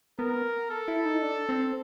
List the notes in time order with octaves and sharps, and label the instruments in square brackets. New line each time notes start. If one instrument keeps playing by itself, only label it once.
[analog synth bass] B3 [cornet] A#4
[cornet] A4
[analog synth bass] E4
D#4
D4
C4